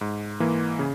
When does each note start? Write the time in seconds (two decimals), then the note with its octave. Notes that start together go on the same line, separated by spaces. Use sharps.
0.01 G#2
0.40 E3 A#3
0.79 C#3